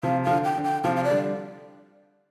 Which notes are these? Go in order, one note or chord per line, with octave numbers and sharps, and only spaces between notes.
C3 F3 F5
F3 F5
D3
G5
D3
G5
C3 F3 F5
F5
D5
D3 G3